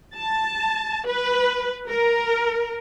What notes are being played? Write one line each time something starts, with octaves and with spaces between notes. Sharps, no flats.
A5
B4
A#4